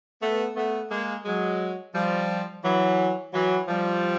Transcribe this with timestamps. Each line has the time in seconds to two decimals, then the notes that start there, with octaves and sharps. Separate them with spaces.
0.22 A3 B3
0.56 A3 B3
0.90 G#3 A#3
1.25 F#3 G#3
1.95 F3 G3
2.64 E3 F#3
3.33 E3 F#3
3.68 F3 G3